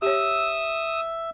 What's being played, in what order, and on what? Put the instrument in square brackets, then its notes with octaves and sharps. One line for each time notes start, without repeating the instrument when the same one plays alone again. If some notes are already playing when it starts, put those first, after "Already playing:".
[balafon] G4 C#5 [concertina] E5 [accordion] D#6 E6